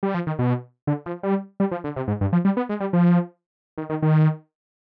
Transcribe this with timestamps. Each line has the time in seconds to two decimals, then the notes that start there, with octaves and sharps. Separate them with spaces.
0.03 G3
0.14 F3
0.27 D#3
0.39 B2
0.87 D3
1.06 F3
1.23 G3
1.60 G3
1.71 F3
1.84 D3
1.96 C3
2.08 G#2
2.21 G2
2.33 F3
2.45 G3
2.57 B3
2.69 G#3
2.80 G3
2.93 F3
3.78 D#3
3.90 D#3
4.02 D#3